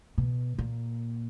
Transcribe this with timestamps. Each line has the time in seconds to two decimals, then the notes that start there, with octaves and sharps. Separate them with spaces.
0.18 B2
0.58 A#2